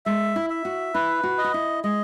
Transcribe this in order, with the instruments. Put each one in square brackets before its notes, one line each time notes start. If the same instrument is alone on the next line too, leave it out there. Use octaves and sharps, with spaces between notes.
[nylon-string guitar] G#3 [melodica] E5
[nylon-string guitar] E4
[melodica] E5
[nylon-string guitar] F#4
[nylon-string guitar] E4 [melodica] B4
[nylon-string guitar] F#4
[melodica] D#5
[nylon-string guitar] F#4
E4
[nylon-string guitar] G#3 [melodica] D#5